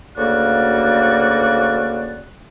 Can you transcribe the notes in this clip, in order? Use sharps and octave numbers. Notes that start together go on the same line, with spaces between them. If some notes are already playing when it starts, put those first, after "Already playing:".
D2 C#3 A#3 F#4 D5